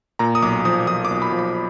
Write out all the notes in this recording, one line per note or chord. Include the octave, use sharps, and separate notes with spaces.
A#2 A#5
D#6
B1 D6
F3 D#6
F3 D#6
D6
B1
B5
F3
B5